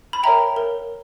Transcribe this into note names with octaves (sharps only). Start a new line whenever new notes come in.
B5
A#4 C#5 E5 G5 A#5
A#4